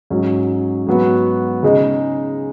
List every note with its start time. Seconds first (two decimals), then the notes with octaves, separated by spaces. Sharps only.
0.10 G#2 F#3 C#4
0.86 G#2 F#3 B3 F#4
1.63 C#3 G#3 D#4